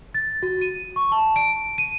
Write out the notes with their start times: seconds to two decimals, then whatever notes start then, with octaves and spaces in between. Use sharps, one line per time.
0.14 A6
0.43 F#4
0.61 D#7
0.96 C#6
1.12 A5
1.36 D7
1.78 D#7